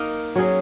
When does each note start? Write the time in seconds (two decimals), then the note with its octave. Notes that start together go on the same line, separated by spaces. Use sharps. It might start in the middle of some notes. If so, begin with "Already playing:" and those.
Already playing: A#3 D#4 A#4 D#5
0.36 F#3 C#4 G#4